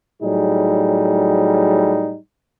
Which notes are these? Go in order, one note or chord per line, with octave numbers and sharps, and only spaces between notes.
A2 F#3 G3 D#4 G#4